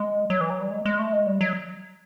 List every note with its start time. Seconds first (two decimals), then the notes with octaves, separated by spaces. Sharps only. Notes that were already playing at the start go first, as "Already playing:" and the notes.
Already playing: G#3
0.30 F#3
0.41 E3
0.50 F#3
0.61 G3
0.71 G#3
0.85 G#3
0.99 A3
1.13 G#3
1.27 G3
1.41 F#3